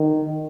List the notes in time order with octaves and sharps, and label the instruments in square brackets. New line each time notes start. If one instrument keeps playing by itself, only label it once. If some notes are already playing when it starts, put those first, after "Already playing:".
Already playing: [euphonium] D#3